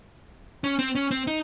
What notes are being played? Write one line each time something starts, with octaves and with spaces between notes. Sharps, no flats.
C#4
C4
C#4
C4
D#4